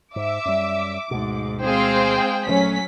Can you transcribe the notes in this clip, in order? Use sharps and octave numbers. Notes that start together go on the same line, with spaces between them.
G#2 E5 D6
F#2 G3
D2 G#2 B2
G#3 C4 G#4 C5 F5 G5
A#1 D#3 F#3 A3 C#4 B6